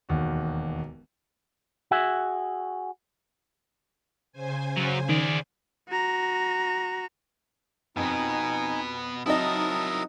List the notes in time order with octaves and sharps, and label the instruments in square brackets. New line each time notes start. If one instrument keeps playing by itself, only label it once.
[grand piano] E1 D#2 F#4
[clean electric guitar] F#4 G#4 E5
[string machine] C#3 C5 G#5
[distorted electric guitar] F#3 C#4
[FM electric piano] D#3 [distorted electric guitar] G#4 D5
[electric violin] F#4 A#5
[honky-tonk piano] F2 C4 [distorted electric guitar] B2 B3 [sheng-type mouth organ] D#4 G#5
[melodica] F#3 D#6 [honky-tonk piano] C4 D#4 D#5 [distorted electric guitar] E4 A#4 [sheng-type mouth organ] A5